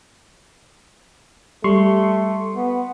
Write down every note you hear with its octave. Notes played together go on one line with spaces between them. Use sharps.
G3 A3 C6 C#6
B3